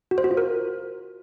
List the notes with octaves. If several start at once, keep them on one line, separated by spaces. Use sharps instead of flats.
F#4
C5
F#4
F4
A#4